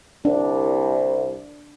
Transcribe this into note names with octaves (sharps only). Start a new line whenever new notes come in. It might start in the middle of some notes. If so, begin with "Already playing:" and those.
C2 D4